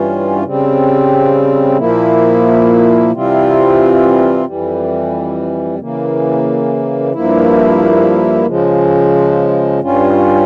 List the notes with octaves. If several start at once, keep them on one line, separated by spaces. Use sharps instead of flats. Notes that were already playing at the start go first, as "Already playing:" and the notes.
Already playing: G2 E3 G3 C#4 F4
C#3 G3 C4
A#2 F3 A#3 E4
C3 E3 G3 C4 F4
F2 E3 G3
C#3 E3 A#3
G2 F3 A#3 E4
C#3 F3 G#3
G2 G3 C#4 F4